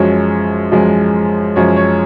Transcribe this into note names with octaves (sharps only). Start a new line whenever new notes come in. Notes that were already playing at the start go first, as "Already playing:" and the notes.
Already playing: F#2 F3 G#3 C#5
F#2 F3 G#3
F#2 F3 G#3 C#5
C#5